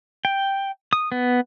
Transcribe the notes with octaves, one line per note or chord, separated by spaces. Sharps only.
G5
D#6
B3